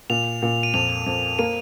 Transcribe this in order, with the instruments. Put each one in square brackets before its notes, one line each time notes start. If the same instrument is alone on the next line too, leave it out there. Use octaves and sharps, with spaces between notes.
[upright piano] A#2 [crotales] F7
[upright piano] A#2
[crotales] D#7
[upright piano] F2 [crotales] F7
[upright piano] F2
[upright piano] A#3 [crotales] D#7